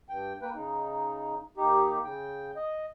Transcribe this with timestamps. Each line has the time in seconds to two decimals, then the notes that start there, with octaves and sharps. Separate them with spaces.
0.09 G2 G5
0.42 A#3 B4 G5
0.55 C#3 D#4
1.57 D#2 D#4 G4
2.04 C#3 G5
2.56 D#5